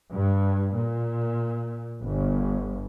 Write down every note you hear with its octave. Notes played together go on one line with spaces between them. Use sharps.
G2
A#2
G1